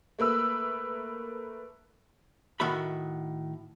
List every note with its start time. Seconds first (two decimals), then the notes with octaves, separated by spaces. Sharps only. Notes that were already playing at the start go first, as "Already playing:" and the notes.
0.19 A3 A#3 B4 E6
2.60 A2 D#3 F#4 E5 B5